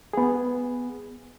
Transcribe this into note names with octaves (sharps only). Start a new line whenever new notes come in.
B3 G#4